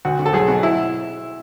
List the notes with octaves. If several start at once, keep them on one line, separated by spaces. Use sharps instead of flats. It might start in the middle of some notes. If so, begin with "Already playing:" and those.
D2 F#4
D3
A4
B1 G#4
B2 F#4
E4